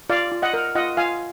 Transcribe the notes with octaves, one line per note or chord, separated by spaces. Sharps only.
F4 D5 F5
F4
D#5 F#5
A#4
F4 D#5 F#5
F4 F5 G#5